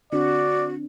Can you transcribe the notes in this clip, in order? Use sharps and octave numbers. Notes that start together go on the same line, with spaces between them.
D3 C4 D4 F#4 D5